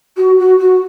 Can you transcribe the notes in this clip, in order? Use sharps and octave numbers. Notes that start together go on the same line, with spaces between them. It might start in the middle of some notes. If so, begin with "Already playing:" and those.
F#4
F#4
F#4